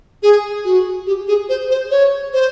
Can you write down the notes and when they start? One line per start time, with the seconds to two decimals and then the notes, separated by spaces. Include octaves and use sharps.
0.23 G#4
0.65 F#4
1.07 G4
1.28 G#4
1.49 C5
1.70 C5
1.91 C#5
2.33 C5